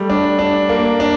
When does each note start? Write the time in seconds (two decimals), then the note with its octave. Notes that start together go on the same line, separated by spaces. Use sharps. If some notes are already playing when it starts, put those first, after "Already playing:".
Already playing: G3 A3
0.10 D4
0.39 D4
0.69 A#3
1.00 D4